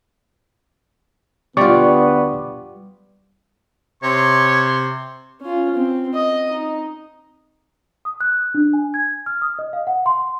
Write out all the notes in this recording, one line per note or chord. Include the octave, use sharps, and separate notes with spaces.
D2 D3 G3 B3 F4 D5 C#6 D6
C3 C#5 C6
C#4 F4
C4
D#5
D#4
D#6
F#6
D4
G#5
G#6
F6
D#6
D#5
F5
F#5
C6